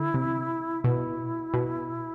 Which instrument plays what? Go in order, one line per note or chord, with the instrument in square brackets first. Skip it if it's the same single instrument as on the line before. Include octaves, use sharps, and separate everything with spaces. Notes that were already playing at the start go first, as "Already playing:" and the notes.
Already playing: [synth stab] D3 [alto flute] E4
[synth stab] C3
[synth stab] B2 [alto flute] E4
[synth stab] B2